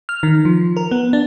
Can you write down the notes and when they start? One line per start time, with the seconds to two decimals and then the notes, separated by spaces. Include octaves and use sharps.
0.09 F6
0.23 D#3
0.45 F3
0.77 A#4
0.91 B3
1.13 D4